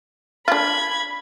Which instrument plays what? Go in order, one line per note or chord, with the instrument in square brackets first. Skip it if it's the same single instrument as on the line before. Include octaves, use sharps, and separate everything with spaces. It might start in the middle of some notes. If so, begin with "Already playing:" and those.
[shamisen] D4 F4 [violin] B5 G#6